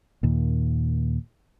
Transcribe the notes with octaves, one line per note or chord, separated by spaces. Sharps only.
D#2 A#2